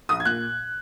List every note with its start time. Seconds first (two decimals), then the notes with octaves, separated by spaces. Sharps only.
0.09 A#1 D#6
0.20 G#6
0.25 A#2 F#6